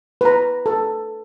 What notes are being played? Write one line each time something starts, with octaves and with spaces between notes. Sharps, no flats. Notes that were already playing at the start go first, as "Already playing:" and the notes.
B4 A#5
A4